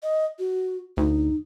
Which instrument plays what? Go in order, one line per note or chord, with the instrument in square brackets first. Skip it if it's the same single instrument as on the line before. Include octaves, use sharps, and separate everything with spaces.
[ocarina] D#5
F#4
[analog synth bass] D2 [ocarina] D#4